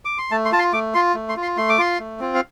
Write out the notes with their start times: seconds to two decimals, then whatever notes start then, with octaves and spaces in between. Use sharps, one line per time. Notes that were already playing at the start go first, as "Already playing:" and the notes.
0.05 D6
0.18 C6
0.31 A3 A5
0.45 C6
0.52 F4 A5
0.59 C6
0.73 A3 D6
0.94 F4 C6
1.15 A3
1.29 C6
1.37 F4
1.43 C6
1.57 A3 C6
1.70 D6
1.78 F4 C6
2.00 A3
2.19 C4 F4
2.35 F5